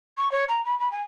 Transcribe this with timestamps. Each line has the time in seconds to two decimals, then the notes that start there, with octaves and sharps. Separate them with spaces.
0.17 C#6
0.32 C#5
0.48 A#5
0.65 B5
0.80 B5
0.91 G#5